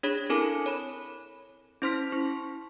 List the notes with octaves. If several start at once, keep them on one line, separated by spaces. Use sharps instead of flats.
D4 G#4 C#5 B5
C4 E4 A4 A#4 G#5 D6
C#5 B5
C#4 E4 C5 C6 F6 B6
E4 C#6